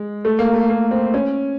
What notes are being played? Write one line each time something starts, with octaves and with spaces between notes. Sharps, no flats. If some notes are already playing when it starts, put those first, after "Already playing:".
Already playing: G#3
A3
A#3
A3
A#3
C4
C#4